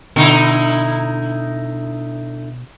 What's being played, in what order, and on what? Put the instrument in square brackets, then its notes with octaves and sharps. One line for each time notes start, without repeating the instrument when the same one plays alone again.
[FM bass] B2 [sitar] D3 D#4 E4